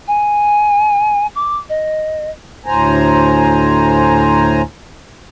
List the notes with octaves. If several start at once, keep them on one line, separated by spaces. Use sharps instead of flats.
G#5
D6
D#5
D2 A2 C5 G#5 A#5